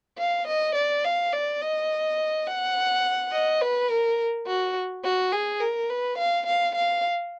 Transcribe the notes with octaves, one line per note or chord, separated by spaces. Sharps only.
F5
D#5
D5
F5
D5
D#5
F#5
D#5
B4
A#4
F#4
F#4
G#4
A#4
B4
F5
F5
F5